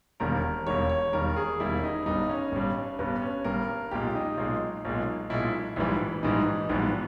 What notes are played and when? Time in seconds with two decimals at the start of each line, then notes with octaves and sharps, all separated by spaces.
0.20 E1 D#2 D#3 G3 A#4
0.66 E1 D#2 D#3 G3 C#5
0.89 C#5
1.13 E1 D#2 D#3 G3 A#4
1.36 G#4
1.60 E1 D#2 D#3 G3 E4
1.83 D#4
2.06 G1 G2 G3 D#4
2.29 C#4
2.52 G1 G2 G3
2.99 G1 G2 G3 B3
3.22 C#4
3.45 G1 G2 G3 A#4
3.91 B1 A#2 G#3 G4
4.15 D#4
4.37 B1 A#2 G#3
4.85 B1 A#2 G#3
5.30 B1 A#2 G#3 E4
5.76 A#1 G#2 E3 G3 E4
6.23 A#1 G#2 E3 G3 D#4
6.69 A#1 G#2 E3 G3 B3